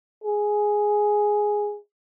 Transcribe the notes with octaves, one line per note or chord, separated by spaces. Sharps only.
G#4